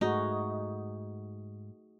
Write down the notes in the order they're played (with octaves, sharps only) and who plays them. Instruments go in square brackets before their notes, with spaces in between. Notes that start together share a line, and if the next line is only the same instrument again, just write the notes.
[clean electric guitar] G#2 [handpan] A3 F#4 G#4 [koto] D#4